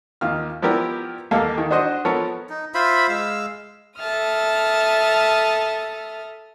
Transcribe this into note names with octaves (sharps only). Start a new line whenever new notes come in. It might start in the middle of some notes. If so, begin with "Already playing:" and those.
D#2 D#3 F4 F6
F3 B3 E4 G4 A#4 D5
D#2 A#3 A4 F5
D#3
D4 F#4 C5 D#5
F3 B3 A4 A#4 C#5
D#4
F4 C5 E5 B5
G#3 F5 E6
A4 E5 A5 D#6 F6